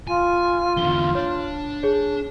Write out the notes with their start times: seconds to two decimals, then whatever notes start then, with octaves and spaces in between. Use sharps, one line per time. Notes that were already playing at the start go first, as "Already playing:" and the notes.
0.07 F4 G#5
0.77 E2 D3 G7
1.15 D4 C#5
1.83 G#4 C#5